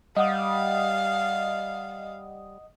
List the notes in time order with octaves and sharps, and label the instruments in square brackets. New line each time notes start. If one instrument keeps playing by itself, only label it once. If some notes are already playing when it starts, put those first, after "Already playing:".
[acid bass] G3 [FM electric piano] D#5 F#5 D#6 [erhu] F5